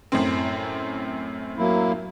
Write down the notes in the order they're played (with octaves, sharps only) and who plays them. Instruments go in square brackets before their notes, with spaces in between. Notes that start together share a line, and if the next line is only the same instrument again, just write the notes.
[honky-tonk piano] F#2 A2 C4
[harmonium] F#3 A#3 E4